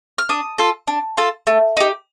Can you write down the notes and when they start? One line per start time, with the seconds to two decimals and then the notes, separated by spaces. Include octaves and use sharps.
0.18 F6
0.29 D4 D#6
0.58 F4 A4
0.87 D4
1.17 F4 A4
1.47 A3
1.77 D#4 G4